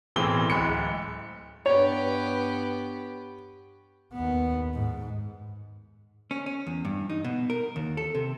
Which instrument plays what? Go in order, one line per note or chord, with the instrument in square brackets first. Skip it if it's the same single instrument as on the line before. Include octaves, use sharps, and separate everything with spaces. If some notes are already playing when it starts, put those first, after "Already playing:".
[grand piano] B1 A2 E3 C4 G#4 G7
D1 G#3 B5 C#7
[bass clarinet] G2 [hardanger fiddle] B3 G4 [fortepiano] C#5
[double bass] D#2 B3
G#2
[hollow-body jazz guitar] C#4
C#4
E2
G2
D#4
B2
A#4
D#2
A4
C3